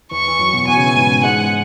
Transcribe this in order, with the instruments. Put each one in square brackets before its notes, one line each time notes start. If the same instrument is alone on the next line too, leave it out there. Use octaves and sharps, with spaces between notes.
[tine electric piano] E2 E3 [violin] C#6
[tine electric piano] E3
F#2 F#3
B2 B3
[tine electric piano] B2 B3 [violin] G#5
[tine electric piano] C#3 C#4
E3 E4
G#2 G#3
[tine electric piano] G#2 G#3 [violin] F#5